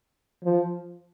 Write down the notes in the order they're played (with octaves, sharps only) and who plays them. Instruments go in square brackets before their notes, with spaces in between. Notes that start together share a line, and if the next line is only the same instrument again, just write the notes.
[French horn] F3